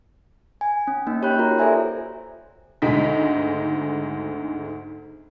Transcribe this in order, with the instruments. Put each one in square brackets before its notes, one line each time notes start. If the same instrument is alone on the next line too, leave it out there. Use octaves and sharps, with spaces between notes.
[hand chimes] G#5
C#4
A#3 D#4
G4 C#5 G5 B5 F#6 G6
F4 F#4 A#4 A#5
A4 C5 D5 E5 G#5 A#5
[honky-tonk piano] G#1 D2 G#3 D#4 B6